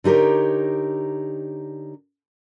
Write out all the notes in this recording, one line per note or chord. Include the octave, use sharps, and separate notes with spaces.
D3 D#4 G4 A#4 C#5